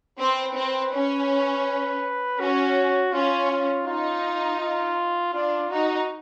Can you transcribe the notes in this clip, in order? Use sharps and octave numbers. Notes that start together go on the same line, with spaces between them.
C4 B4
C4
C#4
C#4 F#4
C#4 F4
F4
D#4 F4
F4
D4 F4
D#4 F#4